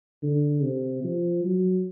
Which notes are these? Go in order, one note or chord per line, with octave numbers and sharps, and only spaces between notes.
D3
C3
F3
F#3